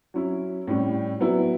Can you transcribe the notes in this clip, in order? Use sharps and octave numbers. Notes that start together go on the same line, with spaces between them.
F#3 C#4 E4
A2 G3 C#4
F#3 B3 E4